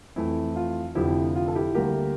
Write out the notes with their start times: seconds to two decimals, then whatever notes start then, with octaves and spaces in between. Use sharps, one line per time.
0.16 F2 E3 A3 E4
0.56 F4
0.95 F1 F2 D3 F3 E4 G4
1.36 F4
1.48 A4
1.55 E4 G4
1.75 D2 D3 G3 A#3 G4 A#4